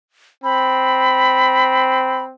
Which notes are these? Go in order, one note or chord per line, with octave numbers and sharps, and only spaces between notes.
C4 B5